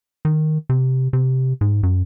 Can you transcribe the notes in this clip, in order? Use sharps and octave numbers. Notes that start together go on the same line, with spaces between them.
D#3
C3
C3
G#2
F#2